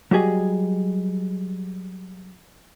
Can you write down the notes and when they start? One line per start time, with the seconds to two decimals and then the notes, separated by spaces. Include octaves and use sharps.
0.11 F#3 G3 G4 G#4 D#5